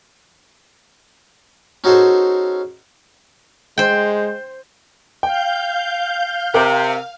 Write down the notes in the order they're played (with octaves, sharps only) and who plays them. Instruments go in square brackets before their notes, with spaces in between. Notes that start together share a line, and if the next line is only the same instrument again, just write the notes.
[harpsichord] C#4 D#4 F#4 G#4 A4 C5
[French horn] G#3 [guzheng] C5 G5
[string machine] F5 G6 [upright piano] G5
[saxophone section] C3 [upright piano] A#4 G5 D6 [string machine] F5